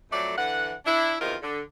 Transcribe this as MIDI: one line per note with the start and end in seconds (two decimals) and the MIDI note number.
0.12 0.33 41
0.12 0.33 54
0.12 0.33 57
0.12 0.33 60
0.12 0.33 74
0.37 0.73 50
0.37 0.73 52
0.37 0.73 78
0.86 1.15 62
0.86 1.15 64
1.21 1.35 40
1.21 1.35 48
1.21 1.35 51
1.21 1.35 65
1.21 1.35 70
1.42 1.61 50